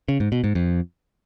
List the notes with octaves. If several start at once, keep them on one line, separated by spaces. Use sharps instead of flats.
C#3
G#2
B2
G#2
F2